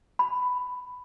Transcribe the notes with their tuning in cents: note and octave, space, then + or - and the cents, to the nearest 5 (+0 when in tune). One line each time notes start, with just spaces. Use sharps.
B5 +10